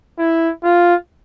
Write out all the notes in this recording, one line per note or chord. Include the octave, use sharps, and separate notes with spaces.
E4
F4